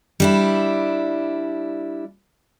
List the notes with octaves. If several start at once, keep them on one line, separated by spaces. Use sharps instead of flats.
G3 D4 E4